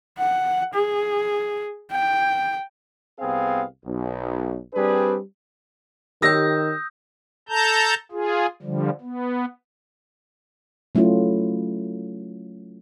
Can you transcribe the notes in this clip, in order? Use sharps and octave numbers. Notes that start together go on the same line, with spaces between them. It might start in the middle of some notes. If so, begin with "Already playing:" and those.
F#5
G#4
G5
C2 B3 C4 G#4 F5
B1
G3 C4 D4 G#4 B4
D#3 G4 C#5 D#6 E6 G6 A#6
A4 A5 A#5 G6
F4 G#4
D3 F3 G3
B3
F#3 A3 C#4 E4 F4